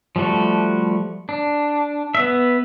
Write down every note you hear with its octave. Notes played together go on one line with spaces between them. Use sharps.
F3 G3 A3 F#4
D4
B3 E5